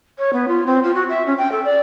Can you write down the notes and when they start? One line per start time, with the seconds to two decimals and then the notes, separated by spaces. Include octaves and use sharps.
0.18 C#5
0.33 B3
0.48 F4
0.66 C4
0.83 F4
0.94 F#4
1.09 E5
1.26 C#4
1.37 G5
1.51 A4
1.64 D5